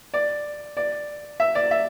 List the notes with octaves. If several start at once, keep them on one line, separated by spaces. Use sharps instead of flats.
D5
D5
E5
D5
E5